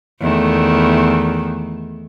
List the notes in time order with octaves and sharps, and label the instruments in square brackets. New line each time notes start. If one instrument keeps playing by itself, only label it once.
[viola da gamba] E2 D#3 A3